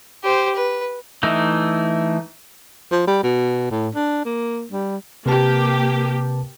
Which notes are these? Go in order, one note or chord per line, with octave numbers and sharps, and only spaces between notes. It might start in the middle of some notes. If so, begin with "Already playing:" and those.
G4 C5
B4
E3 A3 D#4
F3
G3
B2
A2
D4
A#3
G3
C3 A#3 G4 B4 A5